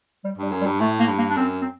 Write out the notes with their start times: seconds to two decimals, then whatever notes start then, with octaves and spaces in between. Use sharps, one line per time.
0.24 G3
0.38 G2 G3
0.52 F#2
0.61 G3
0.66 G2
0.80 A2 A3
0.99 A#3
1.09 G2
1.18 A#3
1.30 D4
1.37 F#2 C4
1.61 C4